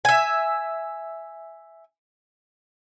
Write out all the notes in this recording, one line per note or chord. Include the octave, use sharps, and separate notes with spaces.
E5 G#5